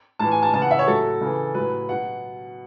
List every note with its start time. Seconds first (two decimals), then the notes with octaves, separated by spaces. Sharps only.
0.19 A2 E3 A5
0.31 G#5
0.43 A5
0.54 C#3 E3 A5
0.62 F#5
0.71 E5
0.79 C#5
0.87 A2 F#3 A4
1.21 C#3 E3
1.55 A2 F#3 B4
1.89 B2 F#3 F#5